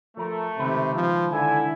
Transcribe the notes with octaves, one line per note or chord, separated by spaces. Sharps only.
F3 A3 A#4
C#2 C3 D#3 B4
F3
D3 E4 G#5